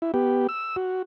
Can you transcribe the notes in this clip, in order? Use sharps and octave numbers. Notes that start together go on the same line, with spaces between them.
E4
B3 G4
E6
F#4